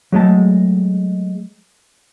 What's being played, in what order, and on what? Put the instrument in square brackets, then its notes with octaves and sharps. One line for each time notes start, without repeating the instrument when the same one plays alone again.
[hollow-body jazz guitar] F#3 G#3 A3 A5